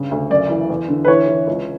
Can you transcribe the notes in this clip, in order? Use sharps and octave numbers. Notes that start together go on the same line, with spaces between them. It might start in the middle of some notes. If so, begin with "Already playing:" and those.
Already playing: G2 C#3
D2
F#2 D5
E3
E2
D3
B4
E3 C#5
E3
C#2